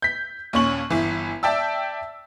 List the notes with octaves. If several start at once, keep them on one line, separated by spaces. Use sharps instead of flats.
G6 B6
D#2 A#2 C#4 C#6 F#7
G1 E3
D5 E5 G5 A5 E6